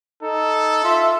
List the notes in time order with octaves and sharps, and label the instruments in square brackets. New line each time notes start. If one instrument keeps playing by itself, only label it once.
[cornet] D#4 [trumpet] A4
[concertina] F4 [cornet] E5